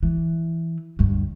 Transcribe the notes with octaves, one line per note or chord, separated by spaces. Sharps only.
E3
D2 G2